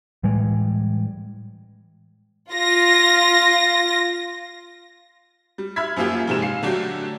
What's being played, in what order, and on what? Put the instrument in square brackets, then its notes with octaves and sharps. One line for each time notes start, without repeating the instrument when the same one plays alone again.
[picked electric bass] A2 E3 G3 G#3
[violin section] F4 A#6
[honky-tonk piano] G3
E5 B5 E6 F6 G#6 B6
F#2 F3 A#3 F4 G4
F1 G#2 C3 E7
F5 C7
D3 F#3 A3 D4 F#4 G4